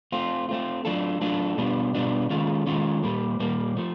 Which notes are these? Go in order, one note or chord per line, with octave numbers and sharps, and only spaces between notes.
A3 C4 F4
A3 C4 F4
F#3 A3 D4 F4 A4
F#3 A3 D4 F4 A4
B2 G3 B3 D4 F4
B2 G3 B3 D4 F4
D#3 G#3 C#4 F4 A4
D#3 G#3 C#4 F4 A4
A#2 G3 A#3
A#2 G3 A#3
F3 A3